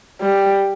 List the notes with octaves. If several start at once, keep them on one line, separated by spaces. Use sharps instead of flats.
G3